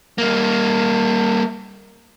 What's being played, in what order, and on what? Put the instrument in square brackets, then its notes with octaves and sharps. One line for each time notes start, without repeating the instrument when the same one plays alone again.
[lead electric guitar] G3 A#3